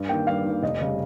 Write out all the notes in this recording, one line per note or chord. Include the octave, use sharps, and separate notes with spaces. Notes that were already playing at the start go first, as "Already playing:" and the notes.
Already playing: G2
D#3 A#3 G5
G2 F5
D#3
A#3
F1 D#5
C#3 G3